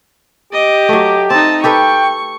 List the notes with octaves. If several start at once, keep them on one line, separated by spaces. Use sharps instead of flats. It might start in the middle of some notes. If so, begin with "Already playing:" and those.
G4 D#5 D6
F#3 A3
C4 D#4 A5
G4 A4 B4 G5 C#6